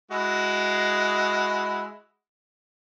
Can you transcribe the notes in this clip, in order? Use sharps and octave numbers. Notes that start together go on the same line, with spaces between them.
G#3 E4 F#4